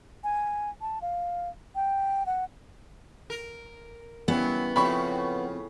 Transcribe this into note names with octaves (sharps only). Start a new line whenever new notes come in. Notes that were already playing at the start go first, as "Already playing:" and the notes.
G#5
A5
F5
G5
F#5
A#4
C#3 E3 F#3 G3 B3
A2 C#3 F3 C4 B4 B5 C#6